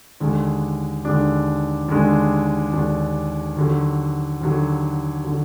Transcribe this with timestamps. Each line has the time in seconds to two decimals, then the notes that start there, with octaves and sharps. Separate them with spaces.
0.20 D#2 D3 G#3 D4
1.05 D#2 D3 G#3 D4
1.89 D#2 D3 G#3 D4
2.73 D#2 D3 G#3 D4
3.57 D#2 D3 F#3
4.41 D#2 D3 F#3
5.24 D3 F#3